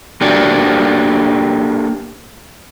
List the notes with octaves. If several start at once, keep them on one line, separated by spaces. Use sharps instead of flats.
A#3 D4 F#4 G4 A4 D5